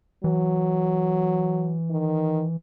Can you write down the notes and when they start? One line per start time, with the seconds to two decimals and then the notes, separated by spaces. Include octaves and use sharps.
0.24 E3 F#3
1.91 D#3